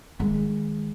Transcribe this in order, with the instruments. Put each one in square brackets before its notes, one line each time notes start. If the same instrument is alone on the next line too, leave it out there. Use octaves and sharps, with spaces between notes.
[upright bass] D#3 G#3